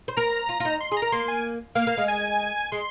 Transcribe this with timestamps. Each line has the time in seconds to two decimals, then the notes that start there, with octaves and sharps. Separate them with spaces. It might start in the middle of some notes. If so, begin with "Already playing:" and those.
0.08 C5
0.17 A#4 A#5
0.49 F4
0.60 F4
0.65 D#4
0.81 C6
0.92 G#4
0.97 A#5
1.02 A#4
1.12 A#3 C6
1.28 G#5
1.75 A#3 F5
1.87 A#3
1.98 G#3
2.08 G#5
2.72 G#3 C6